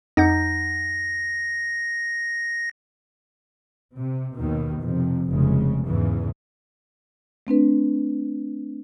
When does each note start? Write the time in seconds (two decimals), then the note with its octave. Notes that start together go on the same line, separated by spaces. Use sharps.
0.17 F2 D#4 F#5 G6 A#6
3.96 C3
4.36 D#2 B2 D#3
4.81 F2 C3
5.30 F1 C#3 G#3
5.85 E2 G#2 C#3 E3
7.47 A3 C4 D4 B4